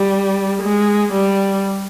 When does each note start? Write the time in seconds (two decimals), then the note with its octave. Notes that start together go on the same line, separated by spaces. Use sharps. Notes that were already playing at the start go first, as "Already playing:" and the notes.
Already playing: G3
0.62 G#3
1.13 G3